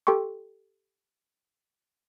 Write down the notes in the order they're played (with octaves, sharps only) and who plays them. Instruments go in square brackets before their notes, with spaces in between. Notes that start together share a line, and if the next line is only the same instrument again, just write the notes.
[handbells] G4 A4 G5 C6 C#6